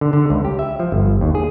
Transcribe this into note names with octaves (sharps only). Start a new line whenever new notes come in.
D3
D3
C#2
G4
E5
F3
G1
D#2
G#4